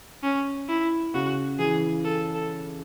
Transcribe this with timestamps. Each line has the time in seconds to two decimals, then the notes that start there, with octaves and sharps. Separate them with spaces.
0.23 C#4
0.69 E4
1.14 C#3 F#4
1.59 E3 G#4
2.05 A4
2.35 A4